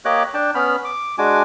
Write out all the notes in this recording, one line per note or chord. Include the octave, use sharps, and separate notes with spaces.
A#3 G4 C#5 D#5 D6 F#6
D4 G5 A5
B3 C#4 B5 F6
D6
G#3 D4 F#4 G#5 D6